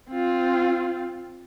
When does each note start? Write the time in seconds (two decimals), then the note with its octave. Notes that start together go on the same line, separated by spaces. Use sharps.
0.10 C4 F4